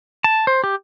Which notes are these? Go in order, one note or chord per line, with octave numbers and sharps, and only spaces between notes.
A5
C5
G4